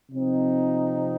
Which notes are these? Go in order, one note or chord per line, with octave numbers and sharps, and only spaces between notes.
C3 F3 C4 D#4